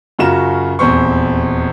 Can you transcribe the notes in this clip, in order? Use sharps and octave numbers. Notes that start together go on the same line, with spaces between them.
F#2 C#3 F4 F#4 A#5 E7
D#1 E2 C4 C#6